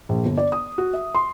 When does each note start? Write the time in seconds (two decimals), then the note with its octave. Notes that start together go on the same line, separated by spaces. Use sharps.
0.09 A#1
0.25 G1
0.37 D5
0.52 D#6
0.78 F#4
0.93 E5
1.15 C6